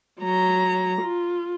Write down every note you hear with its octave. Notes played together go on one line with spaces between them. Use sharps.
F#3 A#5
F4